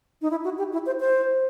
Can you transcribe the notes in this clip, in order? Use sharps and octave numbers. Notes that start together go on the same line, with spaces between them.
D#4
E4
F#4
G4
E4
C5
C5